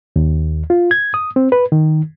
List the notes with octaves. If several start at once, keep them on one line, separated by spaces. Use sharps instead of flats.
D#2
F4
G#6
D#6
C4
B4
D#3